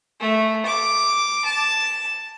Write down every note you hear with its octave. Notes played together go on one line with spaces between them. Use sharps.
A3
D6
A5